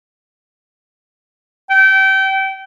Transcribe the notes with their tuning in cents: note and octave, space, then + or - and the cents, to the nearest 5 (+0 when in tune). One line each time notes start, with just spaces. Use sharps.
G5 -25